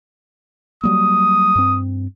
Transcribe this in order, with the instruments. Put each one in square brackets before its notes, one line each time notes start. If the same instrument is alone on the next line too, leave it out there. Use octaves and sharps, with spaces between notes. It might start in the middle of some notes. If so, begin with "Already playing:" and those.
[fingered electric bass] F#3 G3 A#3 [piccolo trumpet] D#6
[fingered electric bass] G2 C4